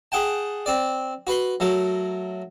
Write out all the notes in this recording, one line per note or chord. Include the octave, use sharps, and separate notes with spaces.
G#4 F#5 G5 A5
C4 D5
F#4 B4 B5 C6
F#3 A3 A#4